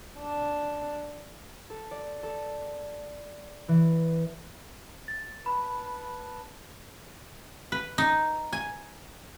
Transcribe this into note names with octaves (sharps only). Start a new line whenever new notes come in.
D4
A4
D5
A4
E3
A6
B4 A5 B5
B4
D#4
G#5